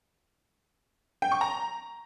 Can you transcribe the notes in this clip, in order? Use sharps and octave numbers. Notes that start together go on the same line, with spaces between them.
G5
C#6
A#5